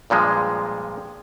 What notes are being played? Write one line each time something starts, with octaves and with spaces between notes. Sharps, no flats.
G2 A#2 F3 G#3